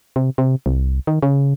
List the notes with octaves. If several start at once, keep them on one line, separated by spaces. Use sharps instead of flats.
C3
C3
C2
D#3
C#3